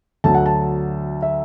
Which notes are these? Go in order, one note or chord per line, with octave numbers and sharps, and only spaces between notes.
D2 D3 F#3 A5
F#5
A5
E5